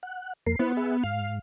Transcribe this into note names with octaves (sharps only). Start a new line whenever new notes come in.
F#5
F2 A#3 A#4 C7
B3 E4 C5
G#4 E5
G#2 F5